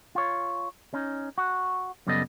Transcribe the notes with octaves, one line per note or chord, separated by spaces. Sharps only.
F4 C#5
C#4 D#4
F#4
F#2 C#3 G3 B3 A4 D#5